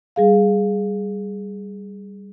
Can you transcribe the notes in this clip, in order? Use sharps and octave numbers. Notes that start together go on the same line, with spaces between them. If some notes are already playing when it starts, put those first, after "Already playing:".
G3 G#4 F5